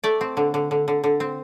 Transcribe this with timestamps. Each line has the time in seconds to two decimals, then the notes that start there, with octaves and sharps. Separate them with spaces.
0.04 A3 D5
0.21 C4
0.37 D3
0.54 D3
0.71 D3
0.88 D3
1.04 D3
1.20 C4